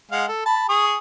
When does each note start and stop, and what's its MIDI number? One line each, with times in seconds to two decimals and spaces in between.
0.11 0.26 56
0.11 0.26 77
0.11 0.26 78
0.28 0.44 69
0.46 0.65 81
0.46 0.65 83
0.69 0.98 68
0.69 0.98 85
0.69 0.98 87